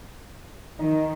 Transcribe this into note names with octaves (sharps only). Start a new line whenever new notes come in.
D#3 D#4